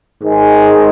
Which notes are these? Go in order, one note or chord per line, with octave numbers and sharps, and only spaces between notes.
G#2 D#3 G#3